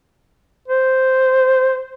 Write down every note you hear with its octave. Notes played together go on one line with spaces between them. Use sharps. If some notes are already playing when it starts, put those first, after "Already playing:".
C5